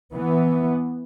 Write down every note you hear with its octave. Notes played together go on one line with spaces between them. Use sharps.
E3 B3